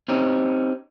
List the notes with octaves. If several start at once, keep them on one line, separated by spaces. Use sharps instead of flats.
C4 C#4 D#4 G4